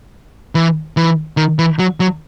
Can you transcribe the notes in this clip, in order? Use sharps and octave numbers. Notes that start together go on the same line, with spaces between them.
E3
E3
D#3
E3
F#3
F#3